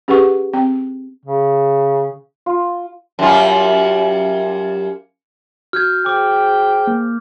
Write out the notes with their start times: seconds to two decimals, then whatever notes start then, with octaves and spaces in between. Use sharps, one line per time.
0.08 C#4 G4 G#4 B4 F#5 C#6
0.53 C4 G5
1.25 C#3
2.46 F4
3.19 F#2 G3 F4
5.73 F#4 F6 G6 G#6
6.06 G#4 C5 G5 D6
6.87 A#3